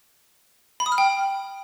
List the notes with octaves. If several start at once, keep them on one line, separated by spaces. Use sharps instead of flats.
B5
D#6
F6
G5